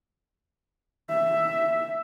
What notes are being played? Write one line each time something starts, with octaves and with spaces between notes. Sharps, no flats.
E5